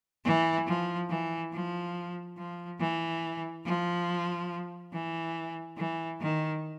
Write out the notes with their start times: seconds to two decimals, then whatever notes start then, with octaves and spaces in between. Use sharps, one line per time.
0.25 E3
0.67 F3
1.09 E3
1.53 F3
2.37 F3
2.79 E3
3.65 F3
4.93 E3
5.77 E3
6.20 D#3